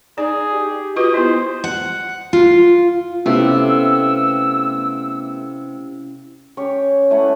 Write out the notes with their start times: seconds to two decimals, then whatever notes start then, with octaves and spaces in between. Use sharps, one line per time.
0.18 D#4 G#4 D5
0.53 G4
0.96 F4 F#4 B4 D#5
1.14 B3 E4 C5
1.64 F#5
2.33 F4
3.26 C3 A3 B3 C#4 E4 G4 F5 E6
6.57 C#4 G4 C#5
7.10 A3 E4 B4 F#5